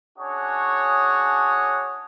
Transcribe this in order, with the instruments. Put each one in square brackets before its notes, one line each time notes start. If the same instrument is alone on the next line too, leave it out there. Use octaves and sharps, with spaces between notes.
[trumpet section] C#4 D4 F#4 G#4 C#5 D#6